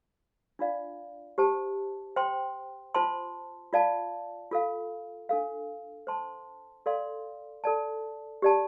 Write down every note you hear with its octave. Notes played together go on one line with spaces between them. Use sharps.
D4 F4 D5 F5
G4 C5 A5
C5 G5 C6
F4 C5 A5 C6
F4 D5 F5 A5
F4 A4 F5
D4 A4 F5
C5 A5 C6
A4 D5 F5 C6
A4 D5 A5
G4 D5 A5